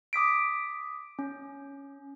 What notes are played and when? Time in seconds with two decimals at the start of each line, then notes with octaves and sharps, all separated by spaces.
0.13 D6 D#6 B6 D7
1.19 C#4